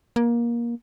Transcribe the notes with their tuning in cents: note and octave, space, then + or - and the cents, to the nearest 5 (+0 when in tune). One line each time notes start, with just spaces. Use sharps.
A#3 +20